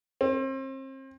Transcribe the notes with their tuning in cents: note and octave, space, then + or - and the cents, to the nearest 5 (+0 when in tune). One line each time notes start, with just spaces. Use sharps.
C4 +35